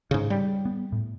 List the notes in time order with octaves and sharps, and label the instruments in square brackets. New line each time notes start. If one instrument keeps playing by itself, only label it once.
[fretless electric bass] G#2 C#3
G3
[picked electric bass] B3
A2